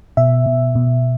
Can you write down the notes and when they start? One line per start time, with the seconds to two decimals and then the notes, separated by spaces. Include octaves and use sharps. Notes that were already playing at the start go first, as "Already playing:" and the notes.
0.17 B2 E5
0.46 B2
0.75 B2